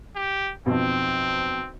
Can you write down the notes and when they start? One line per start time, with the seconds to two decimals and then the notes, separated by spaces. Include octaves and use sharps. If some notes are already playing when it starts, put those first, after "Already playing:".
0.16 G4
0.66 B1 F2 C4